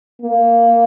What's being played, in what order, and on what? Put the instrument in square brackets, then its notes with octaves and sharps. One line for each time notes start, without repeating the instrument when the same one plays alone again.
[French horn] A#3